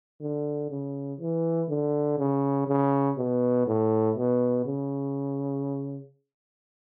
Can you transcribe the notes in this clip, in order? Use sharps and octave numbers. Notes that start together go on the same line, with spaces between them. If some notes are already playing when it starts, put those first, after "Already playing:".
D3
C#3
E3
D3
C#3
C#3
B2
A2
B2
C#3